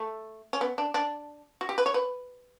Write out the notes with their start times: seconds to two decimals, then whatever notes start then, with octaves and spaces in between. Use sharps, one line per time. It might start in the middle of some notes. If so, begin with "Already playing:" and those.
Already playing: A3
0.53 C#4
0.61 B3
0.78 D4
0.94 D4
1.61 F#4
1.69 G4
1.78 B4
1.86 C#5
1.94 B4